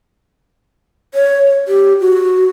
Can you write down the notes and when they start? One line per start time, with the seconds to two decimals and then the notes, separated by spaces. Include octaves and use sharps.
1.14 C#5
1.68 G4
2.00 F#4